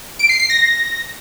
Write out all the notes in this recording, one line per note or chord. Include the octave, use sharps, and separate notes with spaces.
D7
C7
C7
A#6